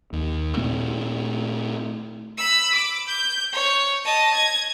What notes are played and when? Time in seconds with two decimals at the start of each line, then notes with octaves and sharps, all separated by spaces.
0.13 D#2
0.57 A#2 A3 C4
2.38 B5 E6
2.75 D6
3.07 G6
3.52 C#5
4.05 D#5 A5
4.34 G#6